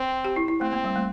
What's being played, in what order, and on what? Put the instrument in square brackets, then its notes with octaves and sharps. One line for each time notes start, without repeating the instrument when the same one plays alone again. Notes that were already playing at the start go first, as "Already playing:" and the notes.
Already playing: [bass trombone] C4
[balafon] G4
E4
E4
[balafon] A3 [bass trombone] C4
[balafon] A#3
G3
A3